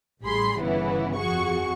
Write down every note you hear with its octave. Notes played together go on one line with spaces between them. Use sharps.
A1 G3 G#4 B5 C6
G1 C#3 E3 B3 E4
F2 F#4 G#4 C#6